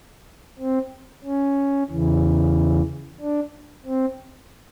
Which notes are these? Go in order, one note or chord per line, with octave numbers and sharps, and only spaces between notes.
C4
C#4
E2 C#3 E3
D4
C4